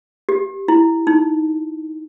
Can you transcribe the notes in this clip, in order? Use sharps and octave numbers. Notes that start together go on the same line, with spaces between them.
G4
E4
D#4